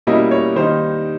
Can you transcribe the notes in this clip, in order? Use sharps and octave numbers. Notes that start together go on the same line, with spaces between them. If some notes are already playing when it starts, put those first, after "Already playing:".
B2 G3 A#3 C#4 E4 D#5
C#5
D#3 G3 A#3 D#4 C5